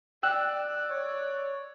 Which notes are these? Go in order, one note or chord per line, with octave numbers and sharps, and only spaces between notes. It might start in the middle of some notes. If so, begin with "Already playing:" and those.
D5 G5 E6 F#6
C#5